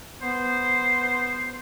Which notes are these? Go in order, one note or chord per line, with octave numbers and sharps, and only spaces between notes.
B3 C5